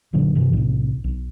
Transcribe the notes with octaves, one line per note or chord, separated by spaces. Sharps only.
F#1 A#2 D3 F#3
G2 C3 E3
B1 A2 C3
B1